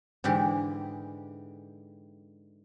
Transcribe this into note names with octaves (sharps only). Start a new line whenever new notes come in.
G#2 D3 E3 G4